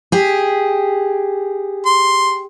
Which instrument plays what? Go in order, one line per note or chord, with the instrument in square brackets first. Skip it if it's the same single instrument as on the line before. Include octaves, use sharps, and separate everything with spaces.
[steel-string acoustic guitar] G4 G#4
[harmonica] C6